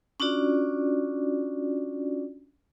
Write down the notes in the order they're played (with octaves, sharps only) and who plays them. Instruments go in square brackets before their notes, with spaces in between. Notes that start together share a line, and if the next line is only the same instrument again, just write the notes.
[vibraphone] C#4 D4 F4 F#4 D5